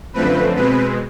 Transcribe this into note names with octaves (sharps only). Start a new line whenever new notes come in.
F#2 D3 F3 A3 C4 B4
B2 G#3 C4 B4